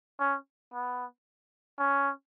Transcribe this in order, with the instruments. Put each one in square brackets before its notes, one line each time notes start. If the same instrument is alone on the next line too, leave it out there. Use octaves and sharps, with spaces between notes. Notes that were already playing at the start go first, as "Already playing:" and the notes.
[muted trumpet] C#4
B3
C#4